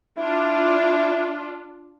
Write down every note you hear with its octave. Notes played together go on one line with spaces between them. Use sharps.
D4 E4 F4